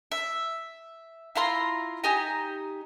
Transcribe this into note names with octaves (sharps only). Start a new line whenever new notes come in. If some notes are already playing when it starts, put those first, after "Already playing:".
E5
E4 F4 A#5 C6
D#4 G4 G#5 A#5